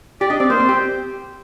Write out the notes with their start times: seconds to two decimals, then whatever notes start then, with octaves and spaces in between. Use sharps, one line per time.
0.21 G4 D5
0.30 D4 D#5
0.39 C4 D5
0.50 A#3 C5
0.60 C4
0.69 G4